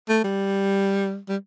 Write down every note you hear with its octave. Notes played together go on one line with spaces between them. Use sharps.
A3
G3
G3